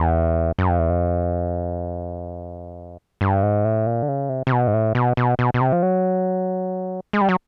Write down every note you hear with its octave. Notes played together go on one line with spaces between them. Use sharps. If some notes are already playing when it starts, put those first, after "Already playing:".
Already playing: E2
F#2
F2
E2
F2
G2
G#2
A2
A#2
D3
C#3
C3
C3
B2
G#2
A2
B2
B2
B2
B2
C3
F3
F#3
G#3
G3
F#3